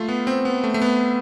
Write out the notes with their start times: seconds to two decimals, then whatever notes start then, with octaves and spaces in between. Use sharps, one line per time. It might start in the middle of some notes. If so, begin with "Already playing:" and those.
Already playing: A3 F4
0.09 B3
0.27 C4
0.45 B3
0.64 A3
0.74 A3
0.82 B3